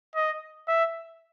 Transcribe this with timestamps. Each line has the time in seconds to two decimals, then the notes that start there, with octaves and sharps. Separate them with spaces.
0.15 D#5
0.68 E5